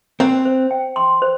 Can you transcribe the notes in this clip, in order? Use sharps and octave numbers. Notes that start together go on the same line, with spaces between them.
C4 C5
C5
G5
C6
C5